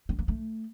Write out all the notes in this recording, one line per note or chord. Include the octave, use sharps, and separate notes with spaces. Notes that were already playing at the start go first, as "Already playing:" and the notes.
C4
A#3
A3